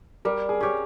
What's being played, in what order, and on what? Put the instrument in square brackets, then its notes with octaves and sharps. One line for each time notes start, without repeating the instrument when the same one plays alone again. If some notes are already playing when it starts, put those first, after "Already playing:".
[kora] G3 [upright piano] A#4
[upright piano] G#4
[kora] C#4 G4 C#5